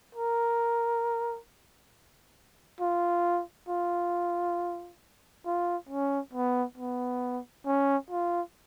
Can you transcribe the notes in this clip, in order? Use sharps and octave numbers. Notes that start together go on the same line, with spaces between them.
A#4
F4
F4
F4
C#4
B3
B3
C#4
F4